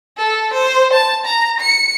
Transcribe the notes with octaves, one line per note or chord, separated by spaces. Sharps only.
A4
C5
A5
A#5
C#7